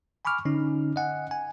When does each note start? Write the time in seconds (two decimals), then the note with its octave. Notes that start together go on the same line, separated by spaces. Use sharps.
0.25 G#5 B5 C#6 D6 F6
0.45 D3 C#4 D#4
0.96 D#5 F#5 G#5
1.31 G#5